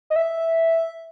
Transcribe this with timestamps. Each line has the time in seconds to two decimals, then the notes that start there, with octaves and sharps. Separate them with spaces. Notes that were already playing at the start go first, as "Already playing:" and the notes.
0.10 D#5
0.16 E5